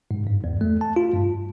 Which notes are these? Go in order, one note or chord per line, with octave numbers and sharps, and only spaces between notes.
G#2
G2
E2
A3
A5
F4
G2